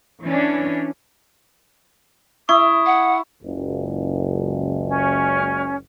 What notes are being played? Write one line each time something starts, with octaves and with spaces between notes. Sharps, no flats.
E3 C#4 D4
E4 C#6 D#6
F#5
F#1 C#2
C#4